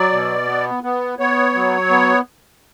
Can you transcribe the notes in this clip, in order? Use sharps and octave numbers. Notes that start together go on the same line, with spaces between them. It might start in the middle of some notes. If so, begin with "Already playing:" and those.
Already playing: F#3 D5
B2
B3
B3
B3 C#5
F#3
B3